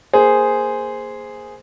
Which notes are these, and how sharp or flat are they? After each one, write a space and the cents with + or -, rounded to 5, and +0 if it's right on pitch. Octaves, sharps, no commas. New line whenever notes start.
A#3 +0 G#4 +0 C5 -10